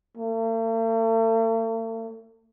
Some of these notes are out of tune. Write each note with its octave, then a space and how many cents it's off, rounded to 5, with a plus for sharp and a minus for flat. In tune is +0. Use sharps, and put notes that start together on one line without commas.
A3 +45